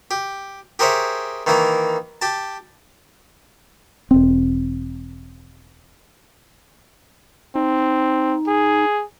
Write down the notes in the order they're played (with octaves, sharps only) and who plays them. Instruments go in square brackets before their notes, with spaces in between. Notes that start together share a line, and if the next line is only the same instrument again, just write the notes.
[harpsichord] G4
G4 G#4 A#4 C5 C#5 E5
D#3 E3 A#3 A#4
G4 A5
[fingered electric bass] E1 C4
[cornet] C4 [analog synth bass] D#4
[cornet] G#4